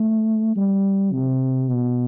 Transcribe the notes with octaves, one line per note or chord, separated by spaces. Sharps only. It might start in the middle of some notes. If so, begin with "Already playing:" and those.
Already playing: A3
G3
C3
B2